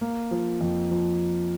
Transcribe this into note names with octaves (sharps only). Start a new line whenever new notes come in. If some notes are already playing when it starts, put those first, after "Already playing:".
A#3
F3
F2
F3